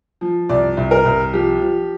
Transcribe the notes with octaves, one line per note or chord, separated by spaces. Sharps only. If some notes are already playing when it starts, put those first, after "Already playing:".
F3
C2 D5
C2
A#4
C2
F3 G4
F3